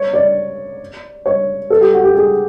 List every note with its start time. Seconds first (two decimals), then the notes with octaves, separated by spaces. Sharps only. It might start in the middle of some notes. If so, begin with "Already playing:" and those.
Already playing: C#5
0.14 D5
1.26 C#5
1.70 A4
1.81 G4
1.93 F#4
2.04 G4
2.16 G#4